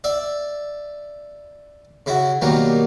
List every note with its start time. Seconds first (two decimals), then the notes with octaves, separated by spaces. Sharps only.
0.04 D5 E5
2.06 C#3 E4 F#4
2.41 B2 D#3 F#3 G3 A#3